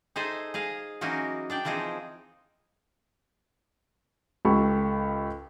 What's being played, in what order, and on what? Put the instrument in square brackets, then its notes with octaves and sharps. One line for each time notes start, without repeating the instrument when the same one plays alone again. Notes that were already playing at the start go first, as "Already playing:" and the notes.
[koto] D#4 G#4 A4 C5 E5 G#5
G#4 D#5 F5
E3 F#3 A#3 C#4 D#4 F#4
D4 D5 G5
E3 F3 C4 D#4 G#4
[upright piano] C#2 G4 A4 B5 C#6